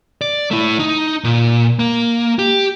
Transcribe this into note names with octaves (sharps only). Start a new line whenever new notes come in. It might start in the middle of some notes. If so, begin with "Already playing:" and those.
D5
A3 E4
D#4
A#2
A#3
G4